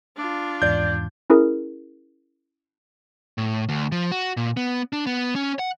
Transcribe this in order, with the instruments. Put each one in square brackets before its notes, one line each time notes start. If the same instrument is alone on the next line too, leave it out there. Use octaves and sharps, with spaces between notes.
[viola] D4 F4
[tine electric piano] E2 G#2 E3 [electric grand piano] D5 G6
[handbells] C#4 E4 G#4 A#4
[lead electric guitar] A2
D2
F3
F#4
A#2
B3
D4
B3
C#4
F#5